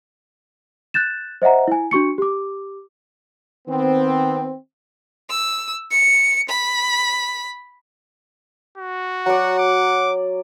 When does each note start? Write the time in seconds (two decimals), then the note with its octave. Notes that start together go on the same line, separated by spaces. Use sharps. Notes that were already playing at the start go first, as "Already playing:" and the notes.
0.94 F#6 G6 A6 E7
1.42 C5 D#5 E5 F#5 A#5
1.68 E4 G#5
1.91 D4 F#4 C#6 C#7
2.18 G4 D6
3.68 D#3 B3 C4
5.30 E6
5.91 C#7
6.49 B5
8.77 F#4
9.26 F#3 D5 F#5
9.59 D6